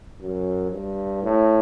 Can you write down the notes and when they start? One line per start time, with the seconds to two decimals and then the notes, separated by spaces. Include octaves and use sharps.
0.21 F#2
0.72 G2
1.23 A2